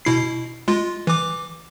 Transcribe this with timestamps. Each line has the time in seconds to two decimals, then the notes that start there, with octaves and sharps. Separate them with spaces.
0.05 B2 E4 C7
0.68 G#3 F4
1.07 E3 D6